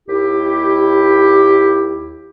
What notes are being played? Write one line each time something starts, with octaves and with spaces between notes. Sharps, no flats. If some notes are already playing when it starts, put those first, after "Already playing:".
D#2 E4 G4